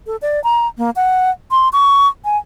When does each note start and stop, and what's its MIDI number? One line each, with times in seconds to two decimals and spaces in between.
0.07 0.16 69
0.22 0.42 74
0.44 0.67 82
0.78 0.90 58
0.96 1.30 78
1.51 1.69 84
1.73 2.08 85
2.25 2.37 80